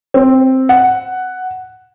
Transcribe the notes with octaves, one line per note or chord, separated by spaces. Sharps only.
C4
F#5